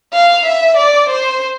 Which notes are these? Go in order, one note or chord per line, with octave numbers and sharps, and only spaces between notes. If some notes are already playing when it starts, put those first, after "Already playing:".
F5
E5
D5
C5